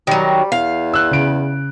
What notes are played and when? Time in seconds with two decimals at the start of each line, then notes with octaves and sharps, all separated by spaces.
0.07 D#3 F#3 G3
0.52 E2 F5
0.94 E6 F#6
1.11 C#3 D7